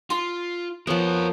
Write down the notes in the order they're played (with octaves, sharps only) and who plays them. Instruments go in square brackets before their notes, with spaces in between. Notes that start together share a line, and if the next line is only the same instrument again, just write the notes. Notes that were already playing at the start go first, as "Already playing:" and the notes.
[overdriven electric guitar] F4 [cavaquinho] C6
[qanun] F3 B3 [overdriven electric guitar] A#4 C#5